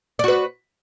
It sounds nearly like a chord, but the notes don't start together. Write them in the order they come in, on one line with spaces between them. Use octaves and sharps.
D5 F#4 B4